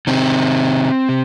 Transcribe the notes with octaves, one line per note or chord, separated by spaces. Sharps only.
C3 D#3 C4
C3